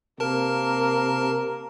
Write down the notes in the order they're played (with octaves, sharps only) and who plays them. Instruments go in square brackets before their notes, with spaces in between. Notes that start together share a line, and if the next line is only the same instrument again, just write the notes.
[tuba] C3 [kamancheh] A#3 [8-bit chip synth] A#4 A5